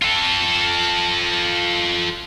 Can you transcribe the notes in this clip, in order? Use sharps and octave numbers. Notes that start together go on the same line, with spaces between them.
F4 A4